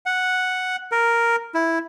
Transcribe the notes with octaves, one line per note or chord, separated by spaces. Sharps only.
F#5
A#4
E4